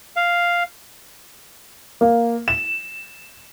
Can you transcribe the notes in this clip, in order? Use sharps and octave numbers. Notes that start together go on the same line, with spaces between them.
F5
A#3
E7